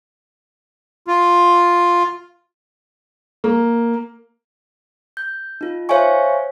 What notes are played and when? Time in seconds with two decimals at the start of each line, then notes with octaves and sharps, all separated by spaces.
1.08 F4
3.44 A#3
5.17 G6
5.61 D#4 F4
5.89 C5 C#5 E5 F5 G#5 C#6